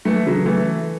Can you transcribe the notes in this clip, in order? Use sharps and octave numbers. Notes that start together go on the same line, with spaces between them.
E3 A3
C#3 F#3
E3 A3